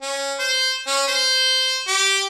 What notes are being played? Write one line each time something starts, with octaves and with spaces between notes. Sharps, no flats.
C#4
C5
C#4
C5
G4